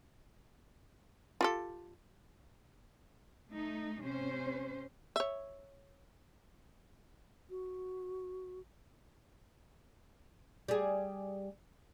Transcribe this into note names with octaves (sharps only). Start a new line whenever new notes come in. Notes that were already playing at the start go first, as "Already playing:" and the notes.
F4 G4 A4
A3 D#4
C3 C#4 C5
C#5 E5
F#4
G3 G#4